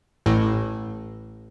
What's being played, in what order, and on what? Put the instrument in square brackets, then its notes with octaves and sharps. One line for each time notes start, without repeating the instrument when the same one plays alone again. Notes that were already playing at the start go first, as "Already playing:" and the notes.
[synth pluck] A1 A2